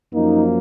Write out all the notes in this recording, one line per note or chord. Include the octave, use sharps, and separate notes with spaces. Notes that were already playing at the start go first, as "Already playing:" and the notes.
F#2 F3 A#3 D#4